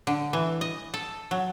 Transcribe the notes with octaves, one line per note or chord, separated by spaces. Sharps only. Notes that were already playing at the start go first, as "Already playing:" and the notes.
D3
E3
D#5
A4
F#3